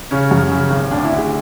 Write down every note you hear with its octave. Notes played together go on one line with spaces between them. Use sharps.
C#3 C#4
F#2
C#3
G#1
D2 D4
E4
D2
G#4